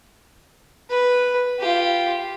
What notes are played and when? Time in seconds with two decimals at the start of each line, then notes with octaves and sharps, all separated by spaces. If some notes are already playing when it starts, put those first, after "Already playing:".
0.90 B4
1.59 F4 G4